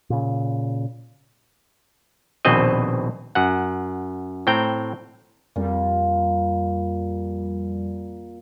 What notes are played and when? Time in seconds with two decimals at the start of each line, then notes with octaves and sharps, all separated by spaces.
0.10 A#2 C#3
2.45 A#1 D#2 B2 C4 B4 D#5
3.35 F#2 F#5
4.47 A2 C4 G5 A#5
5.56 F2 A#2 G3 A#3